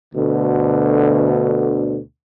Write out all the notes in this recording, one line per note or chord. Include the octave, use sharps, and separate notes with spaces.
D2 B2 D3